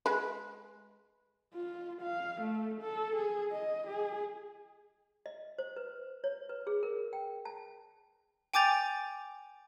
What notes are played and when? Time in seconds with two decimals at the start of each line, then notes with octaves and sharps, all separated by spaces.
0.06 G#3 B4
1.54 F4
2.02 F5
2.41 A3
2.81 A4
3.16 G#4
3.52 D#5
3.87 G#4
5.26 D#5
5.58 C5
5.76 B4
6.24 C#5
6.49 B4
6.67 G#4
6.83 A#4
7.13 G5
7.45 A5
8.54 G5 G#5 D6 G6 A6 F7